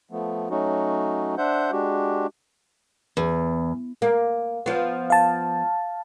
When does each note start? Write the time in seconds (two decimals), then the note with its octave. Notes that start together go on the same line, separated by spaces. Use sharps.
0.11 F3 A3 B3
0.50 F#3 A3 C#4 D#4 F#4
1.38 D4 C5 E5 F#5 G6
1.72 G#3 D4 F#4 G4
3.17 E2
4.02 A#3
4.66 F3 B3
5.10 F5 A5